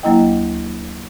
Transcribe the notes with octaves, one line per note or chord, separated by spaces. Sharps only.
D2 F#3 A#3 E4 D#5 G5